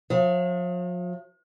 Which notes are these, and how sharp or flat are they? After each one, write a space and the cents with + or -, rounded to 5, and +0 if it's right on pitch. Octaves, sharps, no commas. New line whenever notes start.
F3 +45 F5 -40